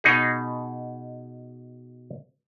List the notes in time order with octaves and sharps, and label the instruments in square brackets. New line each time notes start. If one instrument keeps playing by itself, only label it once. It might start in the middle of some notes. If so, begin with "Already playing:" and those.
[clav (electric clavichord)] B2 D#4 G#4